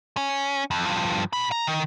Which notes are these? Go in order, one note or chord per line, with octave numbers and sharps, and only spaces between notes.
C#4
F2
G2 F3
B2 B5
A#5
D#3